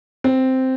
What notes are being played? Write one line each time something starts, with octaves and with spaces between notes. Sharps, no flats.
C4